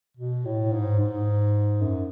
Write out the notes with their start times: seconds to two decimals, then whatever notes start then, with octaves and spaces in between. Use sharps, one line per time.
0.17 B2
0.45 A2
0.72 G#2
0.99 G#2
1.81 F#2